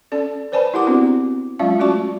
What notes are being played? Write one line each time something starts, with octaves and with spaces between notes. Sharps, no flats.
C#4 A4 D5
B4 C5 D5 G#5 A5 B5
E4 G4 A#4 F#5 G#5 D6
B3 C4 D4 E4 F#4
F#3 G#3 C#4 F4 E5 F5
A3 C#4 F#4 D5 A5 C#6